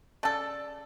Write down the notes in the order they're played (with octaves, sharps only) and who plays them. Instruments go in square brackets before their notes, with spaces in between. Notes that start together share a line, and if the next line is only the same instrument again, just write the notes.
[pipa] C#3 A4 [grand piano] D5 A5